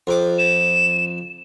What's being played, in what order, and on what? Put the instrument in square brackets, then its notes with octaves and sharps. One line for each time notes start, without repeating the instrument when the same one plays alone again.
[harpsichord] F2 D6
[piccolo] E7